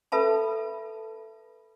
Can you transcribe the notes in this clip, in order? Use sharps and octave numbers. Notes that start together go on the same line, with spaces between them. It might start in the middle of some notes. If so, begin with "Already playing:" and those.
A4 B4 E5 A5 B5